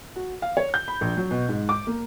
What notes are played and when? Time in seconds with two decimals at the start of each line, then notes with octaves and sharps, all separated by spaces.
0.16 F#4
0.42 F5
0.57 C#5
0.74 G6
0.88 B5
1.01 A#1
1.17 F#3
1.31 B2
1.49 G#2
1.69 D6
1.87 A#3